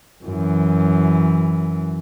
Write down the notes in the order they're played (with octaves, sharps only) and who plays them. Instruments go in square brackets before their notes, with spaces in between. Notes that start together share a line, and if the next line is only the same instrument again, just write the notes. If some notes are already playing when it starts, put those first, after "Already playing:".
[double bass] F#2 E3